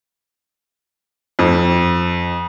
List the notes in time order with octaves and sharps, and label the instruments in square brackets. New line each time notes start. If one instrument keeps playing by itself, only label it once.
[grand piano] F2